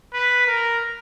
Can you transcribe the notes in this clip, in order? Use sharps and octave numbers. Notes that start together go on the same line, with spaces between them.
B4
A#4